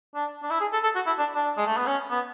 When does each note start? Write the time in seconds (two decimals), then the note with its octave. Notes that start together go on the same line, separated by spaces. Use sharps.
0.15 D4
0.43 D4
0.50 E4
0.61 G#4
0.73 A4
0.83 A4
0.95 F#4
1.06 E4
1.19 D4
1.35 D4
1.57 G#3
1.67 A3
1.77 B3
1.87 C#4
2.11 B3